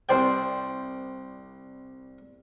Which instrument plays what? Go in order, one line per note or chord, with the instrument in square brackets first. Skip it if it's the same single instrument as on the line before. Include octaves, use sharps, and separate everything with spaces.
[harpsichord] C2 C5 D5 G5